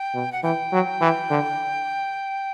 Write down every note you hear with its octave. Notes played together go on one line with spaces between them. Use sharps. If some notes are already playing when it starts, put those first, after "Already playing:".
Already playing: G5
B2
F#5
E3 G5
F#3
E3
D3